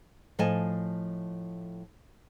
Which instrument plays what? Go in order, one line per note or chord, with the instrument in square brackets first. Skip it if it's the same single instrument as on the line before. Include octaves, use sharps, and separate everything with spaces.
[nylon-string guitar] A2 F3 A4 D#5 G#5 A5